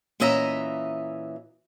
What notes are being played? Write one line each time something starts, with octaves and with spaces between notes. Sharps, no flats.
A#2 E3 C#4 D#5 E5 A#5